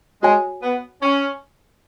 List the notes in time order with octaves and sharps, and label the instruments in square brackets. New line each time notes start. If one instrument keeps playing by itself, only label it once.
[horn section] G#3 [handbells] F#4 C#5 G#5
[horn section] B3
C#4